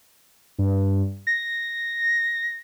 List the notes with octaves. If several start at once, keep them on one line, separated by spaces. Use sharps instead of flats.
G2
A#6